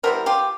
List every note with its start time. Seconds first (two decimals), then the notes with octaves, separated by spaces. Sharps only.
0.03 E3 G3 B3 A#4 C5
0.26 F4 G4